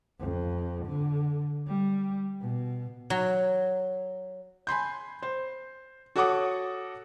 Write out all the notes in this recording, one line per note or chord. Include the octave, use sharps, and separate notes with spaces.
F2
D3
G3
B2
F#3
G#5 B5 C6 G6
C5
F#4 A4 C#5 F#5 D6 D#6